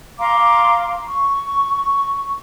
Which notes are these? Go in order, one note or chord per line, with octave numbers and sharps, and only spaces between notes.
F5 A#5 C6 D6
C#6